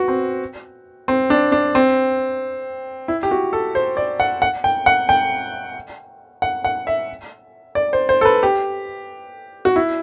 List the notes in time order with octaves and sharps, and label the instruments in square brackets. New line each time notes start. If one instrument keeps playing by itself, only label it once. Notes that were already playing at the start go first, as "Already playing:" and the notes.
Already playing: [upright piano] F#4 B4
C4
C4
D4
D4
C4
E4
G4
F#4
A4
C5
D5
F#5
F#5
G5
F#5
G5
F#5
F#5
E5
D5
C5
C5
A4
B4
G4
F#4
E4